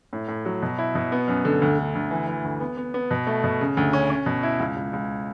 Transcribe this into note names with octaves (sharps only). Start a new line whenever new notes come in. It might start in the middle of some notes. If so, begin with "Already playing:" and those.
A2
A2
F#3
B2
E4
B2
B3
F#2
D3
D2
D3
D2
E3
E3
D2
B3
B3
B3
B2
A3
B2
C#3
D2
C#4
C#4
B2
E4
C#2
C#2
C#2